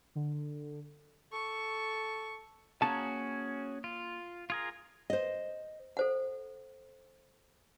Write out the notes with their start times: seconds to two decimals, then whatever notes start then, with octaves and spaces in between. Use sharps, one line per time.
0.15 D3
1.32 A4 C#6
2.82 A#3 C#4 F#4 G#4 A5
3.84 F4
4.50 F4 G#4 A#4
5.10 C5 D#5
5.97 A4 C5 F#5